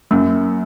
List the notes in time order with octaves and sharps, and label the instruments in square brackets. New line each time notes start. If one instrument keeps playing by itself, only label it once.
[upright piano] F#2 [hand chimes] A#3